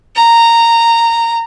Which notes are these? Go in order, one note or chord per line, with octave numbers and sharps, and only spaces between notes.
A#5